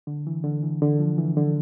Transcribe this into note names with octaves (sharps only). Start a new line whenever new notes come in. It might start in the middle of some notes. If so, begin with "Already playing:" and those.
D3
E3
D3
E3
D3
F3
E3
D3